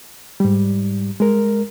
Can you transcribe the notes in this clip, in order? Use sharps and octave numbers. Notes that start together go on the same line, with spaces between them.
G#2 G3
G#3 A#4